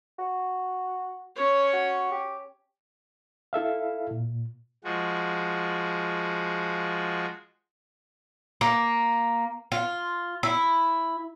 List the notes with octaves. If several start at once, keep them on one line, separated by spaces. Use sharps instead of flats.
F#4
C#4 C#5
F#4
G4
E4 A4 E5 F5
A#2
F3 G#3 F#4
A#3
F4
E4